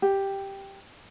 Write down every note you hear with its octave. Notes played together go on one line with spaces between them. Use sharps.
G4